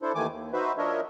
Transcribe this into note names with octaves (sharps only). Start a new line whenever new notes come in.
D4 E4 A4 C5
D#2 D#3 E3 A3 G#5 D6
D#2
D#4 F#4 B4 C5 E5
F3 D4 A#4 C#5 D#5 E5